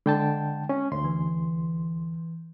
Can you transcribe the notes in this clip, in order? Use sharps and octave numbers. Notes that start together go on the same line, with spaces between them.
D3 G#3 G5 A5
C#4
D2 C6
E3